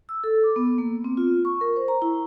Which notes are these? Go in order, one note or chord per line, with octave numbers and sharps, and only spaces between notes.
E6
A4
D6
B3
A#3
C4
F4
C#6
A#4
C5
A#5
E4